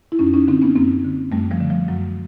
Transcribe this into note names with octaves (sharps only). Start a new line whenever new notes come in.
E4
F#2 C#4 D#4
C#4 D#4
D3 C4 D4
B3 C#4
F#2 A#3 C4
D3
F#2 G3 A3
F3 G3
D3
F3
F#2 F#3